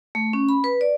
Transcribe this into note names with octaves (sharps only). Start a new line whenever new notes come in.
A3
C#4
B5
B4
D5